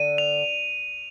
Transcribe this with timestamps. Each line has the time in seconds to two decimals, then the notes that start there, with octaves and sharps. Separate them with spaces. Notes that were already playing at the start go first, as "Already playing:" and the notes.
Already playing: D3 D#7
0.18 F7